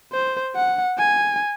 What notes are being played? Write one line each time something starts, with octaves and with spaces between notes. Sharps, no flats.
C5
F#5
G#5